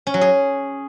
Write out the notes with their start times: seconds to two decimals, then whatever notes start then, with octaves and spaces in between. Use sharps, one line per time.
0.07 C#4
0.14 F#3
0.21 G#4